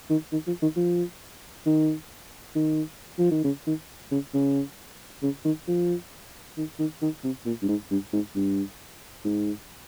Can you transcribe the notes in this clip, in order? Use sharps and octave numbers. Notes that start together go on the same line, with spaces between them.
D#3
D#3
F3
D#3
F3
D#3
D#3
F3
D#3
C#3
D#3
C#3
C#3
C#3
D#3
F3
D#3
D#3
D#3
C3
A#2
G2
G#2
G2
G#2
G2
G#2